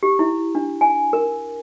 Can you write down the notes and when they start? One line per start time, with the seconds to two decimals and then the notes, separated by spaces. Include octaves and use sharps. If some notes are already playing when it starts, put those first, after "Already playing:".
0.03 G4
0.19 E4
0.55 D4
0.81 G#5
1.13 A#4